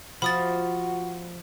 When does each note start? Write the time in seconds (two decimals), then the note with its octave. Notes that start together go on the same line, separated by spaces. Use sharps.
0.22 F3 F#4 B5 D#6 A6